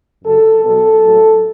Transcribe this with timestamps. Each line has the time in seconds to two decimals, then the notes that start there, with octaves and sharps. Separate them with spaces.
0.24 F#2 C#3 F#3 A4
0.64 B2 F#3 B3 A4
1.04 A2 F#3 A3